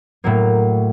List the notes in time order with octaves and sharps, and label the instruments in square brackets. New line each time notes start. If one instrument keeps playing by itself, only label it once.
[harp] A2 F#3 A#3